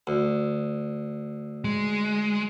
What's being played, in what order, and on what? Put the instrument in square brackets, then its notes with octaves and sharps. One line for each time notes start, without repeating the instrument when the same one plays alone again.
[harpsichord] D2
[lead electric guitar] G#3